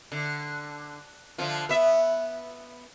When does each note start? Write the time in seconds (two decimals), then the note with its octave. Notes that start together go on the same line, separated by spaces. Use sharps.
0.12 D3
1.38 D3 F3 F4
1.69 B3 E5